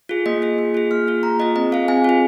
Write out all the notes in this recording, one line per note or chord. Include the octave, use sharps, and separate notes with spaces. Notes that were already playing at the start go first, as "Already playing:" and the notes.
F4 G#4
A#3 D#5
F4 G#4
A#3
F4 G#4
A#3 F6
F4 G#4
A#3 A#5
F4 G#4 D#5
C4 D#5
F4 G#4 F5
C4 G#5
F4 G#4